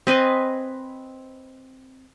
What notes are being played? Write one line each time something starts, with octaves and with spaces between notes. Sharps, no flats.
C4 B4 D#5 G#5